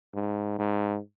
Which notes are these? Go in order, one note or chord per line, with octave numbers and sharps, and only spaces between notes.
G#2
G#2